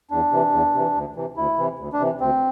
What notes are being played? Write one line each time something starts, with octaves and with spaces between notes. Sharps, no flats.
E2 D4
C3 E3
E2
C3 E3
D2
C3 E3
D2 E4
C3 E3
D2
D4
C3 E3
D2 C4